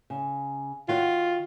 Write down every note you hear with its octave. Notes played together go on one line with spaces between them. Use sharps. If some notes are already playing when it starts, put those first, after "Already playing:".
C#3
D#3 F4 F#4 F#5